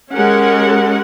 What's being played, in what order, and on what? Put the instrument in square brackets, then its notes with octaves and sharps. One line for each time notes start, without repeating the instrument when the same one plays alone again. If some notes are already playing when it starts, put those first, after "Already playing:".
[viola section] G#3 C#4 G4 A#4 F#5